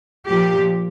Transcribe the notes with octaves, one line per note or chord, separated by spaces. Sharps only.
A#2 F3 G4